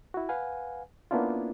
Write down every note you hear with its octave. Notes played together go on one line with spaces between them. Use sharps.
E4 F#4
B4 F5 F#5 G#5
A#3 B3 C#4 D4 E4 F4